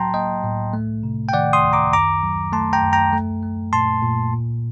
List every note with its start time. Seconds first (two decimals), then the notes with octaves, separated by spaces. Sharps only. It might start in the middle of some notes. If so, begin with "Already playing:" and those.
Already playing: A2 F#3 G5 A5 A#5 C6
0.14 A#3 D#5 G5
0.44 A2
0.73 A3
1.03 C3
1.29 G5
1.33 D#3 D5 F#5
1.53 C6 D#6
1.63 D2
1.73 A#5 D6
1.93 F#2 A#5 D6
2.23 F#3
2.53 A3 A5 C6
2.73 G5 A#5
2.83 F#2
2.93 G5 A#5
3.13 A3
3.43 A3
3.73 A#2 A5 C6
4.02 A#2
4.33 A#2